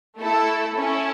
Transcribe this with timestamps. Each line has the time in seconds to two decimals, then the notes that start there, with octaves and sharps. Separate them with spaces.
0.19 A3 E4 A4
0.77 C#4 E4 A4